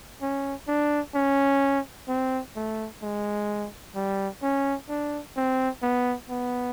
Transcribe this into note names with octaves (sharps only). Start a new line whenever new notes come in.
C#4
D4
C#4
C4
A3
G#3
G3
C#4
D4
C4
B3
B3